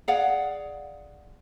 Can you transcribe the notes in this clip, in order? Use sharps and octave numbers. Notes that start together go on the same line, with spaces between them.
G#4 D5 F5 F#5